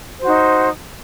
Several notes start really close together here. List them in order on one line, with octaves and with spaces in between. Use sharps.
C5 F#4 D#4